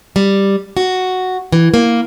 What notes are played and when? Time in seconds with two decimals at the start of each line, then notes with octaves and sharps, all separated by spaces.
0.16 G3
0.77 F#4
1.52 E3
1.74 A#3